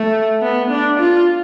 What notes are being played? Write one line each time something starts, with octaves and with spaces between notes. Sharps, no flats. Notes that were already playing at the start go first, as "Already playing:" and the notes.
Already playing: A3
B3
D4
F4